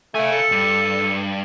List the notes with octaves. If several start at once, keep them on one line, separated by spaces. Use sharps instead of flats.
A3 F5 G#5
A4
G2